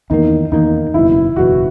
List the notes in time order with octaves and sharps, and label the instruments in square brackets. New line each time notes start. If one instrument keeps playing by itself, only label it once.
[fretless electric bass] E2 D#3 A#3 [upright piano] D#4
[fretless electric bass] E2 D#3 A#3 [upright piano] D#4
[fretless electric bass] F#1 E2 B2 [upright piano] E4
[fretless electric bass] F#1 E2 B2 [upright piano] F#4